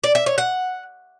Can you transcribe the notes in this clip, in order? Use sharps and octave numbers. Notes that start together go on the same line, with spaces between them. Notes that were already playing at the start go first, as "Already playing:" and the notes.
D5
E5
C#5
F#5